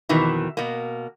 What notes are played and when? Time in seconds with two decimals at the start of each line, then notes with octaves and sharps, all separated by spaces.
0.09 F2 B2 D#3 E3
0.57 B2 A#3